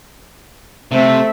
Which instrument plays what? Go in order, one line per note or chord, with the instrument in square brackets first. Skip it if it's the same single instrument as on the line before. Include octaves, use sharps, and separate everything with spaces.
[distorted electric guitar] C3 [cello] A3 C4 [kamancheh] A4 E5